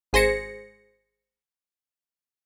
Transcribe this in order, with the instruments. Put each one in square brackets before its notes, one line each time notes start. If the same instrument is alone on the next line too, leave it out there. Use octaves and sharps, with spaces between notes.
[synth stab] G#1 G#4 C5 A#6 C#7